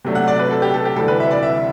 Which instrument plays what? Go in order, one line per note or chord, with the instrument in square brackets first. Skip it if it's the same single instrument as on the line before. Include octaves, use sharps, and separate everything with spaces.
[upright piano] C3 F#3 A3 D4
F#5
D5
B4
A4
G4
A4
G4
D2 C3 E3 G3 D4 A4
B4
E5
D5
E5